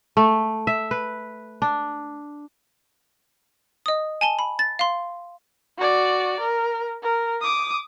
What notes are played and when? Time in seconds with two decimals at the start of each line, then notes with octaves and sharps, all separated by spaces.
0.17 A3
0.67 E5
0.91 B4
1.62 D4
3.86 D#5 D#6
4.21 G#5 A5 G7
4.39 B5
4.59 A6
4.79 F5 C6
5.78 F#4 D5
6.40 A#4
7.02 A#4
7.41 D6 D#6